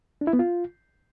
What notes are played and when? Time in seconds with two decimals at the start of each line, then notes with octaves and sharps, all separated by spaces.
0.21 D4
0.27 E4
0.33 B3
0.39 F4